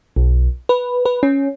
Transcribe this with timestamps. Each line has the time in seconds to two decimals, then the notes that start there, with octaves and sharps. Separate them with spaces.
0.16 B1
0.69 B4
1.05 B4
1.23 C#4